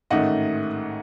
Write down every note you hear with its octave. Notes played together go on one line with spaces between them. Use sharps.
A1 G#2 D#3 A3 D#5 F#5